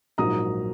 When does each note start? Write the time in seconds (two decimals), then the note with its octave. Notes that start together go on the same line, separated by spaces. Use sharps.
0.18 A#1 G#2 F#3 A#3 A#5 D#6